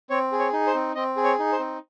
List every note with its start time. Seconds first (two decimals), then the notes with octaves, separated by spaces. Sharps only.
0.10 C4 C#5
0.32 G#4
0.39 C#5
0.53 D#4
0.67 C5
0.75 C4
0.95 C4 D#5
1.16 G#4
1.24 C#5
1.39 D#4
1.52 C5
1.60 C4